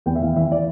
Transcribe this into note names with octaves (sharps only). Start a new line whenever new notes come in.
E2 G5
E5
E3 F5
E3 E5
D5